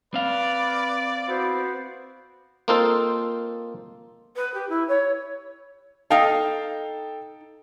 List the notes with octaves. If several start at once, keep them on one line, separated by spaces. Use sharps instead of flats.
C4 B4 D5 F5
B3 E4 F#4 C5
A#3 C4 D#4 F4 A4 C5
B4
G4
E4
C#5
D#4 A4 F5 G5 A5